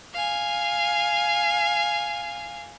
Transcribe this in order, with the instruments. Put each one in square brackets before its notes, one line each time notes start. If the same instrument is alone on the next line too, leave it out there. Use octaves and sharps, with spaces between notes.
[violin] F5 G#5